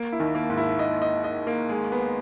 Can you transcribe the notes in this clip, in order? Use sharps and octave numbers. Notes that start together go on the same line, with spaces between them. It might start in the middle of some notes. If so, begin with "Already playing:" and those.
Already playing: A#3
E4
D#2 D#3
A#3
G#2
E4
D#5
D#5
D#5
A#3
G#3
B3